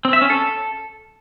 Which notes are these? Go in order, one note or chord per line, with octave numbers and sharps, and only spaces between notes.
C4
E5
C#4
A4